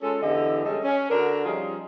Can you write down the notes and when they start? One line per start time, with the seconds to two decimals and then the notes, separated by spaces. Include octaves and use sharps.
0.02 G#3 C#4 F4 A4
0.23 E2 D3 E4 G4 D#5 E5
0.65 G3 G#3 C#4 A4 D#5
0.84 C#4
1.10 D3 D4 F#4 A#4
1.45 F3 G3 C#4 D#4 F4 G#4